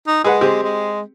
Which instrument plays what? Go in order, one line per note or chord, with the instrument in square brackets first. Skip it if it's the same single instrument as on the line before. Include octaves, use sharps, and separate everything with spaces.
[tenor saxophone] D#4
[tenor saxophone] G#3 [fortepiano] G#4 B4 F#5
[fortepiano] C4 G4 G#4
[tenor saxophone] G#3